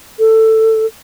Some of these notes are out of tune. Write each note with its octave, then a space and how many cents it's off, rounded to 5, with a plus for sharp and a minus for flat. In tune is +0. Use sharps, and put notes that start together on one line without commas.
A4 +15